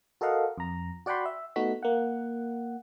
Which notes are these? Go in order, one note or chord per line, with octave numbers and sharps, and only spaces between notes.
F#4 A4 A#4 D#5 F5 F#5
F2 A#5
F#4 D5 F#5 G5 B5 C6
E5
A3 B3 D#4 F#4 B6
A#3 F#5